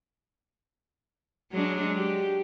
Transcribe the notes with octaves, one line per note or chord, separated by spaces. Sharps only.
F#3 G#3 D4
G4